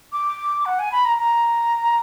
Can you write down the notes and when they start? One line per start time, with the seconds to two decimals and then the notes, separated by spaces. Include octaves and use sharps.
0.13 D6
0.65 F#5
0.79 G#5
0.92 B5
1.05 A#5
1.19 A#5